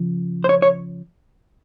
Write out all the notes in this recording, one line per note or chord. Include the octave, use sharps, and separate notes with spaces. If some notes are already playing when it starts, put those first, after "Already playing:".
Already playing: C#3 F3
C5
C#5
C#5